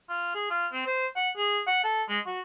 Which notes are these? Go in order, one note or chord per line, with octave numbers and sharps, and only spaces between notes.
F4
G#4
F4
C4
C5
F#5
G#4
F#5
A4
G#3
F#4